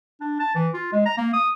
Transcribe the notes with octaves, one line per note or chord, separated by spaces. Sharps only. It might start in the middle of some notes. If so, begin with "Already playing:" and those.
D4
A5
E3
F4
G#3
A#5
A#3
D#6